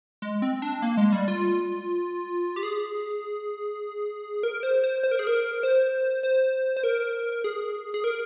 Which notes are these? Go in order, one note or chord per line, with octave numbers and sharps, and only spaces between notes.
G#3
C4
D4
A#3
G#3
G3
F4
G4
G#4
A#4
C5
C5
C5
A#4
G#4
A#4
C5
C5
C5
A#4
G#4
G#4
A#4